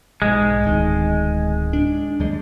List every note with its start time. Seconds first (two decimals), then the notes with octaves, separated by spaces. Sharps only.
0.22 B1 G#2 G#3
0.64 D1 D#3
1.73 D4
2.20 D#2 G3 G#3